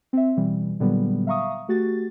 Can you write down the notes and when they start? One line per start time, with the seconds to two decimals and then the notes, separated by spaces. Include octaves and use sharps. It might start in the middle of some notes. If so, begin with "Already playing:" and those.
0.13 C4 E5
0.37 B2 E3 G3
0.80 A#2 D3 F#3 G3 B3
1.27 E5 F5 A#5 C#6 D#6
1.68 A3 F#4 G4 A6